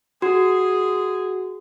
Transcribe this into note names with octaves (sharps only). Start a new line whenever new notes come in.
F#4 G#4